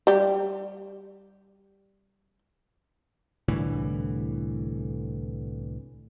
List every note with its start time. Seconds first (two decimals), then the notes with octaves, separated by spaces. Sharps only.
0.07 G3 G4
3.48 C2 A2 D3 E3